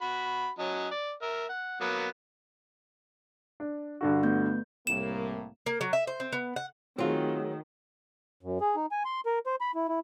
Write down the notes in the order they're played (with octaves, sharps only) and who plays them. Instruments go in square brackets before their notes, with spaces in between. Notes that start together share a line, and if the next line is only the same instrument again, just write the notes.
[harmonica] F#4 B5
F#3 C#4 D#5
D5
A#4 E5
F#5
F#3 A#3 B3
[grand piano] D4
G2 D3 F#4
[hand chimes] A3 B3 G6
[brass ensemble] C2 A2 A#3 [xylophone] E7
[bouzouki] A#3
F#3
E5
C5
C4
B3
F#5
[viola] D#3 [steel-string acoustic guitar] F#3 [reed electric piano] A3 G#4 [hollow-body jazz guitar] C4 F4
[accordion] F#2
G#4
D#4
G#5
C6
A#4
C5
B5
E4
E4